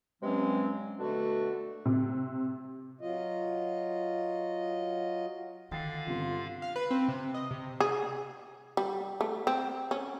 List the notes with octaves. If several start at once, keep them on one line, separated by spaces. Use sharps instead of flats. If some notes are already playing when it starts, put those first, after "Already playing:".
G2 C3 F#3 G#3 C4 C#4
B2 D3 A3 D4 F#4
C3
F#3 F4 D#5
D3 D#3 F5 G5 A6 C7
G1 C3 F4
F5
B4
C4
C3
D#5
C3
G#4
G3
A3
C4
C#4